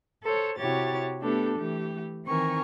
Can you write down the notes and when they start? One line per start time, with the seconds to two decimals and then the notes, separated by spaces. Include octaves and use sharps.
0.22 A4 C5 C#5
0.58 C3 E4 F#4 G4 C#5 A6
1.22 A3 B3 D4 G4 A4
1.58 E3 A3 G4
2.25 D#3 E3 C4 A#4 G#5 C#6